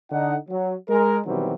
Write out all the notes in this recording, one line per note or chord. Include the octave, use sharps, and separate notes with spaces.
D3 D#4 F#5
F#3
G#3 A#4
B2 D#3 E3 F#3 G3 C4